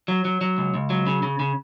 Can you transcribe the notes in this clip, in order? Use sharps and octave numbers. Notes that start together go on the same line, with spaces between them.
F#3
F#3
F#3
C#2
C#2
F#3
C#3
C#3
C#3